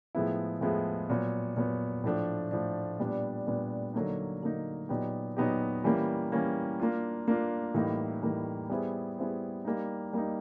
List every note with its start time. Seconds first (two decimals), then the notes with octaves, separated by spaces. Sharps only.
0.15 A2 F3 G#3 B3 E4
0.61 A2 F3 G#3 B3 E4
1.09 A#2 F#3 B3
1.56 A#2 F#3 B3
2.04 A2 F3 A3 D4
2.51 A2 F3 A3 D4
3.00 A#2 G3 B3 D4
3.47 A#2 G3 B3 D4
3.94 D3 F#3 A#3 D#4
4.42 D3 F#3 A#3 D#4
4.89 A#2 F#3 B3 D#4 G4
5.37 A#2 F#3 B3 D#4 G4
5.84 E3 G3 A#3 C#4
6.32 E3 G3 A#3 C#4
6.80 A#3 D4 F4
7.28 A#3 D4 F4
7.74 A2 E3 G3 A#3 D#4
8.23 A2 E3 G3 A#3 D#4
8.70 G3 B3 E4 G#4 C5
9.18 G3 B3 E4 G#4 C5
9.65 G3 A#3 D#4
10.13 G3 A#3 D#4